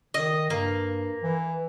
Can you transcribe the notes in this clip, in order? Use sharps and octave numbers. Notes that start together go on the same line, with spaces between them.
D#3 D#5
G2 A#3
E3